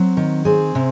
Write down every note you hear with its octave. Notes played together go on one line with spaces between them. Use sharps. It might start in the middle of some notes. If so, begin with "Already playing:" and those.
Already playing: F#3 C4
D#3
C4 G#4
C3